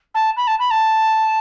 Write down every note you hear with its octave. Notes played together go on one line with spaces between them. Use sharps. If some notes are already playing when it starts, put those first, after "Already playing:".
A5
B5
A5
B5
A5